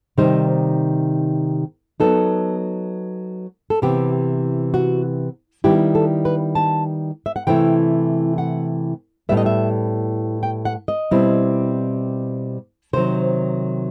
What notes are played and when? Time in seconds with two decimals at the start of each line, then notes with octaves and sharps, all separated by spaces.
0.17 C3 D#3 G3 D#4 C5
2.00 F#3 B3 D#4 A4
3.70 A4
3.82 C3 E3 B3 G4
4.74 F#4
5.64 D#3 G3 B3 E4 G4
5.95 A4
6.25 B4
6.55 A5
7.26 E5
7.36 F#5
7.47 C3 E3 A3 E4 G5
8.38 F#5
9.29 A2 G3 B3 E5
9.37 D#5
9.46 E5
10.43 G5
10.65 F#5
10.88 D#5
11.11 B2 G3 C4 E4
12.93 C3 D#3 F#3 C5